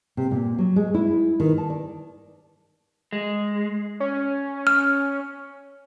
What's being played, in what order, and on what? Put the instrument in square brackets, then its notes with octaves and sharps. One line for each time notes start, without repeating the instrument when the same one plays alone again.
[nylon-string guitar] C3
A#2
F#3
G#3
E4
D#3
A5
D5
[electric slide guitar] G#3
[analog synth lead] C#4
[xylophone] F6